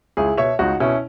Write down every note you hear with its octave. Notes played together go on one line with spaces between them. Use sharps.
C#2 E4 G#4
B2 C#5 E5
C#2 D#4 F#4
B2 C#4 E4